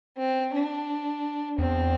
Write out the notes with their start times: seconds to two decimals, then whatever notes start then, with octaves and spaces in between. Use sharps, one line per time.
0.17 C4
0.53 D4
1.58 E2 C4